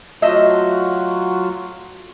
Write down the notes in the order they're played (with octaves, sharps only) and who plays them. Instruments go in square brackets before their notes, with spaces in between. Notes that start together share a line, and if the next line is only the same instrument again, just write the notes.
[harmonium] F#3 F4 F#4 [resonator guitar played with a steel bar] A3 D#5 E5